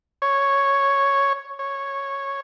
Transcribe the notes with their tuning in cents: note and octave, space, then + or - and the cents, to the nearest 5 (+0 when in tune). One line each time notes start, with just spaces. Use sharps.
C#5 +0
C#5 -5